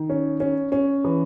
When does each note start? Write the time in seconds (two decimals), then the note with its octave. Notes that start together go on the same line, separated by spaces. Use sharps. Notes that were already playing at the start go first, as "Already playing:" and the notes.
Already playing: D#3
0.10 C#4
0.40 C#4
0.72 C#4
1.04 E3